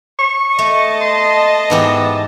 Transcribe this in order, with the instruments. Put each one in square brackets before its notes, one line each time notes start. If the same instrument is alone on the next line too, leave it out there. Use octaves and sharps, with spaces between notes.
[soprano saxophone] C#6
[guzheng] A3 [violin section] D#5 A5
[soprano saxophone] C6
[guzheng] G#2 E3 G4 [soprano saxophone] B3